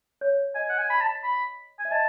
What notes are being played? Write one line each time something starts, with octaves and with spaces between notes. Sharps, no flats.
C#5
D#5 G#5
F#5
G#5
B5
A5
B5
G#5
E5
D#5 A5